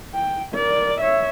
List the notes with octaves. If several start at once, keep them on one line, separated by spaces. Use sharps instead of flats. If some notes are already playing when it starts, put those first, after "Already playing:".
G5
A#4 D5
C#5 E5